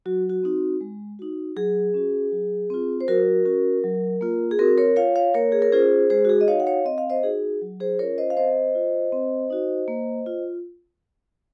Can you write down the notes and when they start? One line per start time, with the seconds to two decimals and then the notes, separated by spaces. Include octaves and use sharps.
0.06 F#3 F#4
0.30 F#4
0.43 C4 D#4 F#4
0.81 G#3
1.19 D#4 F#4
1.56 F#3 G#4
1.94 C#4 F#4
2.32 F#3
2.70 C4 F4
3.01 C5
3.08 F#3 F#4 A#4
3.45 C#4 F#4
3.84 F#3
4.21 A#3 F4
4.51 G#4
4.59 C4 F#4 A#4
4.78 A#4 C#5
4.96 F4 C#5 F5
5.16 C#5 F5
5.34 A#3 A#4 C#5
5.52 G#4
5.62 A#4
5.72 C#4 F4 G#4 C5
6.10 G#3 G#4 C5
6.25 F#4
6.29 G#4
6.41 D#5
6.48 D#4 F#4 C#5 F5
6.60 F#5
6.67 C#5 F5
6.85 C4 D#5
6.98 F5
7.10 C5 D#5
7.23 D#4 F#4 G#4
7.61 F#3
7.80 G#4 C5
7.99 C#4 F4 A#4 C#5
8.18 C5 D#5
8.30 F5
8.37 C4 C5 D#5
8.75 F4
9.12 C4
9.50 D#4 F#4
9.88 A#3
10.26 F4